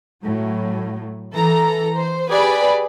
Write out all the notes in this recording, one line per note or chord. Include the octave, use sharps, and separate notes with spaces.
A2 F#3
E3 A4 A#5
C5
G4 G#4 B4 D5 B5